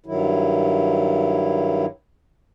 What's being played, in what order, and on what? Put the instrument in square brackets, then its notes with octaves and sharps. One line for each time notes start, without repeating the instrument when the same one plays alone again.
[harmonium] G2 D#3 F#3 E4